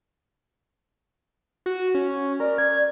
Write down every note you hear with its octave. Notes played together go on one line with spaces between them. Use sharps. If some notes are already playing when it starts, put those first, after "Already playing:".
F#4
C#4
A#4 D5
G#6